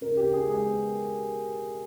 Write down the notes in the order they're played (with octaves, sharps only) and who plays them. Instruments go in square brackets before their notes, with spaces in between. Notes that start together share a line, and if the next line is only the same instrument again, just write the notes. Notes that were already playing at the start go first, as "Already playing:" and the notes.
[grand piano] C#3 A#4
G4
C#3
G#4
G#3 G#4
B3